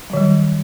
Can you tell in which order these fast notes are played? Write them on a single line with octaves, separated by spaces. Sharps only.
F#3 D#3 G3